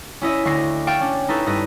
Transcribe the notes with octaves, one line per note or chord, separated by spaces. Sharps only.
C#4 E4 D#5 E5
D2 D#5 C#6 A#6 C7
F5 G5 C#6 A6 D7 E7
C#4 D4
D#4 E4 A4 B4 C#6
G2 A4 B4 D#5